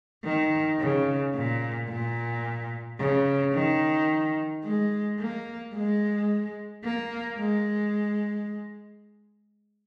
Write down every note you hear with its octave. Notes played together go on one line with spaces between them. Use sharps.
D#3
C#3
A#2
A#2
C#3
D#3
G#3
A#3
G#3
A#3
G#3